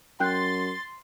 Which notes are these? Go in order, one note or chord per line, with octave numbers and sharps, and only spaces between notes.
F#2 G5 C6 F#6 G6 A6